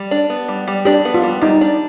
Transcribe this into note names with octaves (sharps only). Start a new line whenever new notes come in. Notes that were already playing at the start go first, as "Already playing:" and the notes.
Already playing: G3
D4
B3
G3
G3
D4 G4
B3
F4
G3
G3 D#4
D4